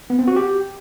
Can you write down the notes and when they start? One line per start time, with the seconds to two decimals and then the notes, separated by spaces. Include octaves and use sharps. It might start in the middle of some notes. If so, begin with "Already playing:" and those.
0.10 B3
0.19 C4
0.28 F#4
0.36 G4